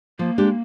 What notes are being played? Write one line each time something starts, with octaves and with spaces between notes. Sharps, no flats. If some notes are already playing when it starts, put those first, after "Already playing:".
F3 A#3
G#3 D4 G4